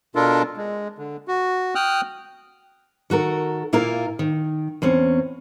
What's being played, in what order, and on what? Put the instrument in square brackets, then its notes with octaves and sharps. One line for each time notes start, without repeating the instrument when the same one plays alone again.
[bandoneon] B2 D4 F4 A4 A#4
G#3
D3
F#4
G5 D#6 F6 F#6
[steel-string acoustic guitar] D#3 F#4 A4 A#4
A#2 A#3 E4 F4 A#4
D#3
E2 C4 C#4